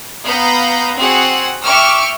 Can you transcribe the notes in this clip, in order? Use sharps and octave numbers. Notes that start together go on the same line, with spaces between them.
B3 F5 A#5 B5 G6
C4 F#4 G#4 F#5
E5 G5 C#6 D6 F6